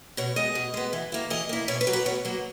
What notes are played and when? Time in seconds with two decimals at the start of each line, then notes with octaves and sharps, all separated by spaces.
0.17 B2 C#5
0.36 G#3 B3 D#5
0.55 B2
0.74 G#3 B3
0.93 E3
1.12 A#3 E4
1.30 E3 D#5
1.49 A#3 E4
1.68 B2 C#5
1.81 B4
1.87 F#3 A#3
1.93 B4
2.06 B2 C#5
2.25 F#3 A#3